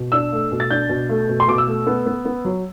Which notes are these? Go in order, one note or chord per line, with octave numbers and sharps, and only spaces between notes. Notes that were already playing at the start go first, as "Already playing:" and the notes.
Already playing: B2
D4 E6
A3
B2
A6
D4 G6
B2
A3
B2
C6
B2 D6
E6
A3
B3
B3
B3
F#3